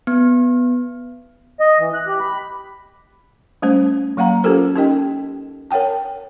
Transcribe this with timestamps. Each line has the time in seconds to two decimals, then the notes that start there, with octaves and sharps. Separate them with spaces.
0.07 B3
1.60 D#5
1.79 E3
1.94 F#6
2.07 G4
2.20 B5
3.62 G3 A3 C#4 C5
4.17 F#3 A#3 F5 F#5 A#5
4.44 C#4 F4 G4 A4 A#4 C5
4.76 C#4 D#4 G4 A#4 D#5 G5
5.71 A#4 C#5 F#5 G5 A5